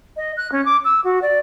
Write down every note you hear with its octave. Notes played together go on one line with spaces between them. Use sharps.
D#5
F#6
C#4
D6
E6
F#4
D5